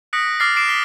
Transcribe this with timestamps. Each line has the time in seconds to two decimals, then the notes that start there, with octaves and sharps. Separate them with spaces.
0.13 D#6 F#6 A#6 B6 C#7 D7
0.40 D6 F6 A6 C7
0.56 D6 C7 D7 E7
0.68 B6 C7 G7